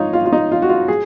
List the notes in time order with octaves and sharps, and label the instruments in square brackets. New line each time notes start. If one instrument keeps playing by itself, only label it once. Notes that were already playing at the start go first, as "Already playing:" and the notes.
Already playing: [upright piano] D#4 F4 C#5
F4
F4
D#4
F4
F#4
F4
G#4